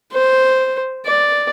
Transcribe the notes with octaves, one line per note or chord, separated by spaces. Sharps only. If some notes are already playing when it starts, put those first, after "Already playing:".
C5
D5